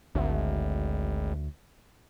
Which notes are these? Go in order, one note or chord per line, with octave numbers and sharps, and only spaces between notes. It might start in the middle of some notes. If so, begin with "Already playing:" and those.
G#1 D2